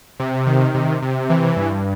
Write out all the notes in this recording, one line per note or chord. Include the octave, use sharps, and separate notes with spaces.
C3
D#3
C3
C3
E3
G2